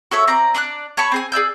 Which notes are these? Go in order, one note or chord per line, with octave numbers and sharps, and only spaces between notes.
F#4 A4 C#5 E5
C4 D5 A#5
D4 D5 C#6 F#6
C#5 A5 B5 C#6
C4 G#4 G#5
G#4 D5 E6 G6